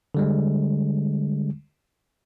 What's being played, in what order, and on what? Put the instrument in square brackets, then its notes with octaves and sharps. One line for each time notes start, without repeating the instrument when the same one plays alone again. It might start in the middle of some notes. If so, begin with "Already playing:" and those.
[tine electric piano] D3 G3 G#3